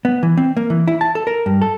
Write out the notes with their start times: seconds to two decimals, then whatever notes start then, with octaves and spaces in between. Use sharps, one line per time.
0.05 B3
0.23 E3
0.37 C4
0.57 A#3
0.70 E3
0.88 E4
1.01 A5
1.15 A4
1.27 A#4
1.46 G2
1.62 A4